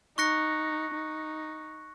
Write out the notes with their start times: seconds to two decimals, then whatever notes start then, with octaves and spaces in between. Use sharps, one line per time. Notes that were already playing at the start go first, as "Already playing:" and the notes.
0.18 D#4 C#6 F#6 A#6 C#7
0.95 D#4